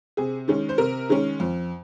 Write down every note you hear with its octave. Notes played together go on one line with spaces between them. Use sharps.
C3 G#4
D#3 G#3 C#4
C5
C3 A#4
D#3 G#3 C#4
F2